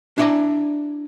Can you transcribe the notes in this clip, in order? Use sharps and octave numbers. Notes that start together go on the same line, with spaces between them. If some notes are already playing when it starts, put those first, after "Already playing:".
D4 E4 C#5 D5 G#5 A#5